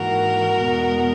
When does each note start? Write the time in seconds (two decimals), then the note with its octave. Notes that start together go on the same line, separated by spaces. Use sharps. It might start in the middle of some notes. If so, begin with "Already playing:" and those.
Already playing: G#2 E3 A#3 F#4 A#4
0.59 E2 B2 G#3 B3